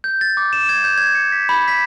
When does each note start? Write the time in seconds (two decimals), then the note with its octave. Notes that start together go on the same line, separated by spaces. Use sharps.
0.04 G6
0.21 A6
0.37 D6
0.53 E7
0.69 G#6
0.84 G6
0.98 G#6
1.15 C#7
1.32 B6
1.49 B5
1.68 B6